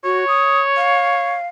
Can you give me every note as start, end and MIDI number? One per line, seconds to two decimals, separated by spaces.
0.04 0.25 66
0.04 1.38 73
0.28 0.60 87
0.77 1.47 77